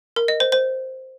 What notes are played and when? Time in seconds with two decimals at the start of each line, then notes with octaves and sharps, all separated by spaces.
0.16 A#4
0.28 D#5
0.40 C5
0.52 C5